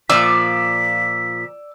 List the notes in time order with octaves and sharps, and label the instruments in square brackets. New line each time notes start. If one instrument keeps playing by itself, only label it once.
[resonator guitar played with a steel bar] A#2 F3 [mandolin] D5 [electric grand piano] E6 [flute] B6